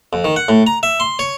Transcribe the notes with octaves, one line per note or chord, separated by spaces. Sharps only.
F2
D#3
F#5
A2
A#5
E5
C6
C#5